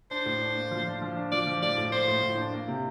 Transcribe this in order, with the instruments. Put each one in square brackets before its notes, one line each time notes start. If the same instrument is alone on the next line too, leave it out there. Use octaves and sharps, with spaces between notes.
[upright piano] D4 [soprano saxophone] C5
[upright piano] A2
D4
A#3
F3
D4
F3
D4
[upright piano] F3 [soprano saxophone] D5
[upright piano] F3
[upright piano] A2 [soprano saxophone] D5
[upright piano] A2
[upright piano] A#3 [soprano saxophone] C5
[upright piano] A2
A2
D4
A#3
C3